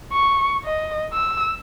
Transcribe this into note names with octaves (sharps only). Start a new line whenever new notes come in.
C#6
D#5
E6